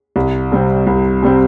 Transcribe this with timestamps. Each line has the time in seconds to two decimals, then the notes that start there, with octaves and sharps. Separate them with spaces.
0.16 C2
0.52 C3 G3 C4
0.87 C2
1.23 C3 G3 C4